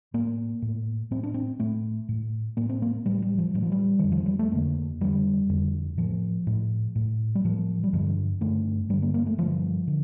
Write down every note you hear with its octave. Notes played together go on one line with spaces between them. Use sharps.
A2 A#3
A2
A2 C4
D4
C4
A2 A3
A2
A2 A#3
C4
A#3
A2 G3
G3
F3
A2 G3
F3
G3
F2 D3 D#3
F3
G3
A3
F2 D3 A#3
F2 D3 G3
F2 D3
A2 F3
A2
A2
G3
A2 F3
G3
G2 D3 F3
G2 D3 A3
G2 D3 G3
A#3
A#3
A3
G2 D3 F3
D3